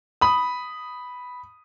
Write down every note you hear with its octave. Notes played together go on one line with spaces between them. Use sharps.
B5 D#6